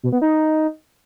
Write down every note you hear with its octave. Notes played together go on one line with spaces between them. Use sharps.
B2
B3
D#4